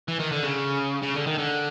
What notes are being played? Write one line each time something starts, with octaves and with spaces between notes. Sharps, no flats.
E3
D#3
D3
C#3
C#3
D3
D#3
D3